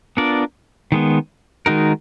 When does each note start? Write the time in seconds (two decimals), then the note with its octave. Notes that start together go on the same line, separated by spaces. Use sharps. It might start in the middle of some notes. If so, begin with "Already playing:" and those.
0.17 B3 D4 F4 A#4 D5
0.92 D#3 G#3 B3
1.66 D#3 G#3 D#4 F#4 A#4